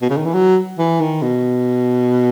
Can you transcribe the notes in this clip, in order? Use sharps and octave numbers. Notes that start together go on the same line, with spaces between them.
B2
C#3
D#3
E3
F#3
E3
D#3
B2